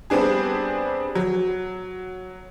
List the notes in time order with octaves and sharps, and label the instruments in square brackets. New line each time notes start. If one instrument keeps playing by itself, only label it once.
[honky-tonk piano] G3 B3 C4 D4 G#4
F#3